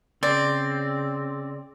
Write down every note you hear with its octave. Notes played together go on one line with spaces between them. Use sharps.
C#3 C4 D5